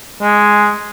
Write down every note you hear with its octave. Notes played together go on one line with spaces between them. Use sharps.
G#3